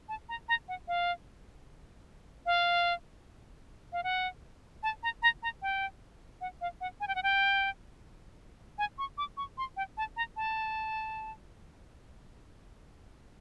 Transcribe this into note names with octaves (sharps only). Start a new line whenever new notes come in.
A5
A#5
A#5
F#5
F5
F5
F5
F#5
A5
A#5
A#5
A#5
G5
F#5
F5
F#5
G#5
G5
F#5
G5
G#5
C#6
D6
C#6
C6
G5
A5
A#5
A5